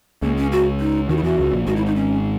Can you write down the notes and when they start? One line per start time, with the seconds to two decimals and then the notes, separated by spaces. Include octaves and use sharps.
0.22 C#2 C#3 A#3
0.37 C#4
0.52 F#4
0.80 D#4
1.09 D#2 D#3 F#4
1.17 E4
1.23 E2 E3 F#4
1.38 C#2 C#3
1.52 A#1 A#2
1.67 G#1 G#2 F#4
1.76 E4
1.86 D#4
1.96 C#4